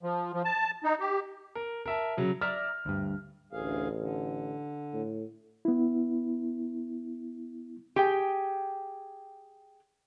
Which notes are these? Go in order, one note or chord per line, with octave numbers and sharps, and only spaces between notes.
F3
F3
A5
D#4
G4
A#4
A#4 E5 A5
C#3 F#3
D5 E5 A#5 F6
D2 G2
A1 D2 G#4 F5
D3
A2
B3 E4
G4 G#4 G5